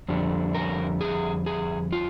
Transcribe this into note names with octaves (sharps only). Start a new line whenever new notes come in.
F2 D3 G3
A#4
G#4
G#4
F4